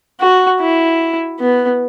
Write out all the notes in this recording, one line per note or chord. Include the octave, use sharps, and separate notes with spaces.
F#4
E4
B3